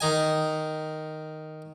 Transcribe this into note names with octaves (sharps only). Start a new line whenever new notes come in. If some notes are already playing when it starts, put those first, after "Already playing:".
D#3 D#4 G#5